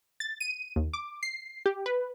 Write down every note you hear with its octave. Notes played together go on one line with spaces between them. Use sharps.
A6
D#7
D#2
D6
C7
G4
B4